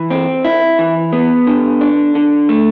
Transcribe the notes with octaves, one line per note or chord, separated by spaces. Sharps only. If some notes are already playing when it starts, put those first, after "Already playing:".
Already playing: E3
C4
E4
E3
B3
D3
D4
D3
A3